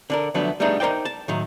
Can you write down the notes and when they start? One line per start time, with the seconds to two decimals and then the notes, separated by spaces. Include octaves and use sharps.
0.10 D3 D4 A#4
0.34 D2 F3 F#3 A3 B3 D4
0.60 G3 A3 B3 D4 D#4 G#4
0.80 D#4 A#4 C5 D5 G5
1.05 A5
1.28 A2 D#3 F#3